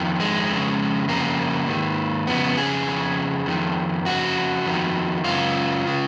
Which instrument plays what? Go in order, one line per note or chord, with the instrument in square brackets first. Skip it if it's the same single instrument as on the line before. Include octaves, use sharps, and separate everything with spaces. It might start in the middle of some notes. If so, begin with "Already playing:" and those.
Already playing: [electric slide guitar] F2 D#3
G#3
F2 C#3
F2 C#3 A#3
G#2 D#3
F2 C#3 B3
G#4
F2 C#3
F2 D#3
F2 C#3 F#4
F2 D#3
F#2 C#3 F4
C#3